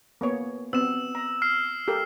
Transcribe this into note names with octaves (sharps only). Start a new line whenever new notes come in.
A#3 B3 C#5
B3 C4 E6 E7
A#5
F6 C7
G4 A4 A#4